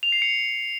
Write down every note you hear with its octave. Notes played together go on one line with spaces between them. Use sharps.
F7
C7
C#7